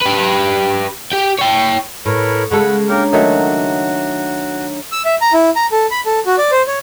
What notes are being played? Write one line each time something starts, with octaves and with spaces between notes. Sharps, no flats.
G4 B4
G4 G5
C#5 G5
A2 A#4 B4 C#5
C#3 G#3 G#4 A4 F#5 B5
A#3 D4 G4 A#4 C#5 A#5
D#3 F#3 A3 F#4
E6
E5
A#5
E4
A#5
A4
B5
A4
F#4
D5
C5
C#5